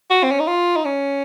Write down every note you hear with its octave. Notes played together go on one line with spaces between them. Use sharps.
F#4
C4
C#4
D#4
F4
D#4
C#4